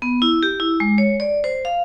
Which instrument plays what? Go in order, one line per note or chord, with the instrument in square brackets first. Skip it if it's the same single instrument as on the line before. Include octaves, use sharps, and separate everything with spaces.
[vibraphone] B3
E4
G4
E4
G#3
C#5
D5
C5
F5